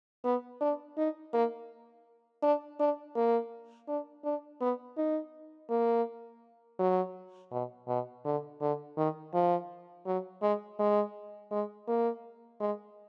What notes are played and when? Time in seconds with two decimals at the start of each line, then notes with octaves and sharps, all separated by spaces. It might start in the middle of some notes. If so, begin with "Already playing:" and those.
0.24 B3
0.61 D4
0.98 D#4
1.34 A#3
2.43 D4
2.80 D4
3.16 A#3
3.88 D4
4.24 D4
4.61 B3
4.97 D#4
5.70 A#3
6.79 F#3
7.51 B2
7.88 B2
8.25 D3
8.61 D3
8.97 D#3
9.34 F3
10.06 F#3
10.42 G#3
10.79 G#3
11.51 G#3
11.88 A#3
12.61 G#3